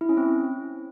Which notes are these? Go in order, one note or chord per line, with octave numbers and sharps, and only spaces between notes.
E4
C#4
C4